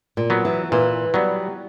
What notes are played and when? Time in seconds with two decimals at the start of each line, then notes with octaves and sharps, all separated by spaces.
0.17 A#2
0.30 F#3 B3
0.45 E3
0.72 A#2 E3
1.14 F#3 G3 B3